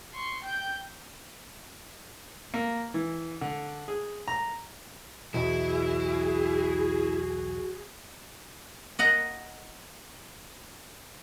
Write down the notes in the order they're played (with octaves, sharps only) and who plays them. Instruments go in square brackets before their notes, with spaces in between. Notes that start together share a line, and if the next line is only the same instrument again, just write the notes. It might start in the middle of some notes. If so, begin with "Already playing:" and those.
[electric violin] C6 C#6
G5 G6
[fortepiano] A#3
E3
D3
G#4
A#5
[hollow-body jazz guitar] B1 E2 [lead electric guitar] E4 [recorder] F#4 [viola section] G#4
[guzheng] D#5 F#5 A#5